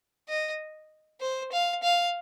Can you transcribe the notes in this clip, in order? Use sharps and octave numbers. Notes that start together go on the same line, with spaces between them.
D#5
C5
F5
F5